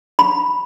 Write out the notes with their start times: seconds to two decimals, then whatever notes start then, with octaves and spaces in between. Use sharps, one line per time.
0.19 B5